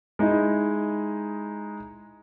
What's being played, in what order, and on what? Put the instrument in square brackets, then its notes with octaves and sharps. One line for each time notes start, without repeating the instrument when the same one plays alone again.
[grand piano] G#3 D#4 E4 D#5